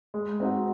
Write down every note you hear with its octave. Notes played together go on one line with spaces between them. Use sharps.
G#3
C4 D#4 F#4